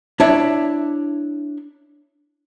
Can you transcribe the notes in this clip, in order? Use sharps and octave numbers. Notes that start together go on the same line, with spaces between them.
D4 E4 C#5 E5